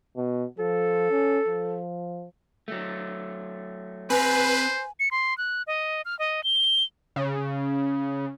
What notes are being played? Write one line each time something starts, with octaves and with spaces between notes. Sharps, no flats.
B2
F3 A4
C#4
F3
F#3 A3
C4 B4 C5 G#5 A#5
C#7
C6
F#6
D#5
F6
D#5
G7
C#3